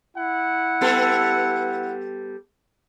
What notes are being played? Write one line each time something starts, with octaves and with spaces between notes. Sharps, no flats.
E4 F#5
G3 B3 A4